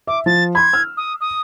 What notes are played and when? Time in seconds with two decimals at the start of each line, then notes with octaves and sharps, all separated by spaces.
0.07 E5 D6
0.26 F3 A6
0.55 B5 C6 G#6
0.73 E6 F6
0.97 D#6
1.21 D#6